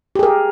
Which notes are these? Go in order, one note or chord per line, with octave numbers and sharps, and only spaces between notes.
G4 G#4 A#4